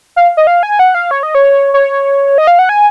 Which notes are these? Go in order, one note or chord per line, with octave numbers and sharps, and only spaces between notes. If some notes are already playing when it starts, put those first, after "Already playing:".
F5
D#5
F5
G#5
F#5
F5
C#5
D#5
C#5
C#5
D#5
F5
F#5
G#5